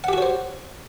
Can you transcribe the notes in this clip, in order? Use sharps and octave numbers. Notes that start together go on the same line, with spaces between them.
F#4 G4 C5 C#5 F#5